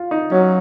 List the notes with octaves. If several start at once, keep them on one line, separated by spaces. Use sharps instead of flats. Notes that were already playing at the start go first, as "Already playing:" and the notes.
Already playing: F4
D#4
F#3 C#4